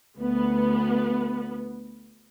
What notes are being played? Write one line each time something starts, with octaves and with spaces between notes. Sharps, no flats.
D2 B3